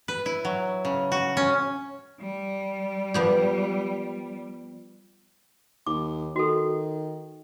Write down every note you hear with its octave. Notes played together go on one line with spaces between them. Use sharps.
B4
E4
F#3
C#3
F#4
C#4
G3
F3 B3 G4
D#2 D6
D#3 F#4 A4